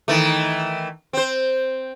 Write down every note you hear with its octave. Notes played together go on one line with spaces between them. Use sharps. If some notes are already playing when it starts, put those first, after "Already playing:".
D#3 E3 A3
C4 C5